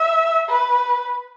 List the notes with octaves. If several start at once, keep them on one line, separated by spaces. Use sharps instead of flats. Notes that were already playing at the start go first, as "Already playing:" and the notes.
Already playing: E5
B4